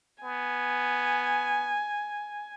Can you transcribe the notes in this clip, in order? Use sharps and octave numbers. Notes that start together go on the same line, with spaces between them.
B3 G#5